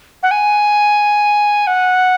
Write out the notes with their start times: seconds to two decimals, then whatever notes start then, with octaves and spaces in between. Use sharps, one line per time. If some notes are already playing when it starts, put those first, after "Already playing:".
0.23 F#5
0.31 G#5
1.67 F#5